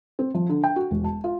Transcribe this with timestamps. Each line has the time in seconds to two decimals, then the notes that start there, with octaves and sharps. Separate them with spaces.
0.19 C4
0.34 F3
0.49 D3
0.64 G5
0.76 F#4
0.91 E1
1.04 A5
1.24 F4